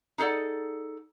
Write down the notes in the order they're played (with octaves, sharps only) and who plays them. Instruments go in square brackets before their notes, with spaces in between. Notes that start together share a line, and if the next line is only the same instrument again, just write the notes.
[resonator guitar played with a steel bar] D#4 G#4 A4 D5 F#5